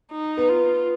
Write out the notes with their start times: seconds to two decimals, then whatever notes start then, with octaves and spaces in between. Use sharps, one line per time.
0.11 D#4
0.37 B3
0.49 F4